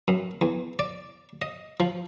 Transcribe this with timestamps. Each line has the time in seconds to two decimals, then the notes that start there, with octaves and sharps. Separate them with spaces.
0.08 F#2
0.41 E2
0.79 D5
1.42 D#5
1.80 F3